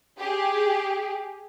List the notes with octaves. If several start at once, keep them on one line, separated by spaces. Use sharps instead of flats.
G4 G#4